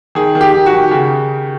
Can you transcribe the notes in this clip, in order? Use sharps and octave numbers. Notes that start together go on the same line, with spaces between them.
D#3 G#4
D#3
G4
D#3
F#4
D#3
C#3